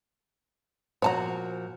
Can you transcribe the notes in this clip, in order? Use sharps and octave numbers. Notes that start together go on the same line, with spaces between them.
A#2 F3 F#4 C#5 A5 A#5